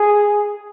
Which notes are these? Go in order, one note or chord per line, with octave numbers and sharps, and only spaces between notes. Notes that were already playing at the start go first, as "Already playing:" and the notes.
Already playing: G#4